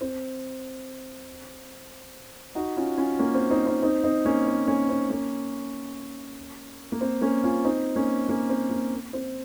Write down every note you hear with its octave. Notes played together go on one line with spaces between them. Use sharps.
C4
D#4 F#4
C#4 F4
C#4 F4
A#3 C#4
C4
C4 D#4
C4 D#4
C4 D#4
C4 D#4
A#3 C#4
C4
A#3 C#4
C4
A#3 C#4
A#3
C4
A#3 C#4
C#4 F4
C4 D#4
A#3 C#4
A#3 C#4
C4
A#3
C4